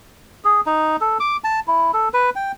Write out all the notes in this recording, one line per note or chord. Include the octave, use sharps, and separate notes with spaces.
G#4
D#4
A4
D6
A5
E4
A4
B4
G5